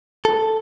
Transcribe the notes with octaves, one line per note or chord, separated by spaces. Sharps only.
A4